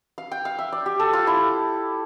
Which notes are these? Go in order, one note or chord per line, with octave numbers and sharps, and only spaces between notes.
F5
G5
F5
E5
D5
G4
A4
F4
E4